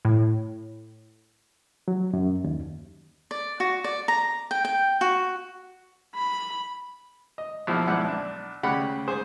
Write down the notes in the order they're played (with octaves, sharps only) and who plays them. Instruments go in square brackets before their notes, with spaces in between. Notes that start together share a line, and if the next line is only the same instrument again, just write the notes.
[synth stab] A2
[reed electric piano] F#3
F#2
D#2
[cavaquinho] D5
F#4
D5
A#5
G5
G5
F#4
[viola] B5
[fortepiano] D#5
A#1 B2 F3 E4
B1 G#2 F3 E4 D5 F#5
B1 D4
D2 C#3 G4 D5 F#5 B5
G#2 G#4 C5